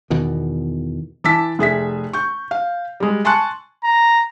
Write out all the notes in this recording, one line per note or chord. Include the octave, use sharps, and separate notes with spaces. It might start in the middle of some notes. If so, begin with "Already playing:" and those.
E2 B2 D#3
E3 A5 D6 E6 B6
F1 G#4 E5 B6
C#6 G6
F5
G3 G#3
G#5 A5 C6 C#6 F#6 C#7
A#5